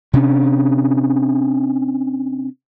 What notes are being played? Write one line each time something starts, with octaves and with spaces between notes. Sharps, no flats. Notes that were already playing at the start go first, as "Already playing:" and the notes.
C3 C#4 D4